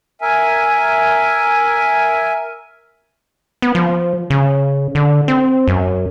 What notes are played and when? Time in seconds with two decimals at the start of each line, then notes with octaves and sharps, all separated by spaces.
0.21 A#4 E5 G#5
3.62 B3
3.75 F3
4.30 C#3
4.95 D3
5.28 C4
5.68 F#2